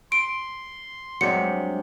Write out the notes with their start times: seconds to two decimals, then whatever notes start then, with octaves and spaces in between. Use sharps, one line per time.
0.12 C6 D7
1.21 G2 C3 F#3 G#3 C5 D5 C#7